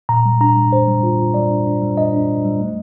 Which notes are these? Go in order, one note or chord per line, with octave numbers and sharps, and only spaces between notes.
A#2 A#5
G3
D4 A#5
G3
D4 C5
G3
F4
F4
G3 D5
D4
D4
G3
D4 D#5
D4
D4
G3
A3